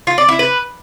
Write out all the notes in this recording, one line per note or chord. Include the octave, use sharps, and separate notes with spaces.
F4
D5
E4
B4